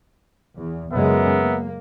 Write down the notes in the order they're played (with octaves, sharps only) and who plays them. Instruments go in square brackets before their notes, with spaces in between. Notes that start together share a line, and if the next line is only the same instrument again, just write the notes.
[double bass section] E2
[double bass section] F#2 C#3 G#3 [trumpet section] B3 A#4 E5
[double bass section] A#3